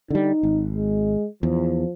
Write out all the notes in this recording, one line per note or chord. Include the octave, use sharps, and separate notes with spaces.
D3 G3 D#4
G#1
G#3
E2 F3